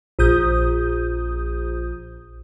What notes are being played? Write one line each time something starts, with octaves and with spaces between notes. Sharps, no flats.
A#1 D#6 G6